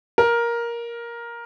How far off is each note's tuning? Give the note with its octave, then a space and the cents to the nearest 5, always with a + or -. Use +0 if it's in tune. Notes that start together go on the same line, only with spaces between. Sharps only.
A#4 +10